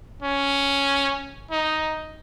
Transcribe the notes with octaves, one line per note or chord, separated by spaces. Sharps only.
C#4
D#4